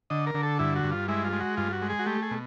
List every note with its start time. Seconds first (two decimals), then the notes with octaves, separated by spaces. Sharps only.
0.10 D3 D#5
0.27 A#4
0.35 D3
0.43 A4
0.59 G2 E4
0.76 F#4
0.84 G2
0.92 F4
1.08 G#3 E4
1.24 F4
1.33 G#3
1.40 F#4
1.57 G2 F4
1.73 F#4
1.82 G#3
1.90 G#4
1.99 F#4
2.06 A3 G4
2.22 G#4
2.31 B2